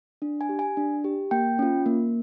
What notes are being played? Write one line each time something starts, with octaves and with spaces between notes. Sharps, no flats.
D4
G#5
G4
G#5
D4
G4
A#3 G5
C#4 F4
A#3